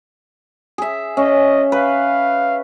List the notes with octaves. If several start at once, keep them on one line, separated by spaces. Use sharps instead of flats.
G#4 E5
C#4 D#5
B4 F5